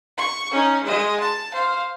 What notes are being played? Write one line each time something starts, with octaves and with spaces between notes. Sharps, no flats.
C#6
C#4 D#4
G#3 D#5
A5
C5 F5